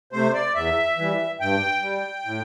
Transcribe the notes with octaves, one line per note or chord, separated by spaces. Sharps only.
C3 A3 C5
D5
E2 E5
E3 G3
G2 G5
G3
A2